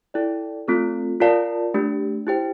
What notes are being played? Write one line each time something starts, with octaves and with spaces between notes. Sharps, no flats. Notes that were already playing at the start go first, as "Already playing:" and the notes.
E4 A4 D5 G5
A3 C4 F4 A4
F4 A#4 D5 F5 A5
A3 D4 G4
E4 G4 C5 G5